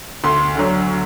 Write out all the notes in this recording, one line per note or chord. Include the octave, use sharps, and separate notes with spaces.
D2 C6
D3 F#3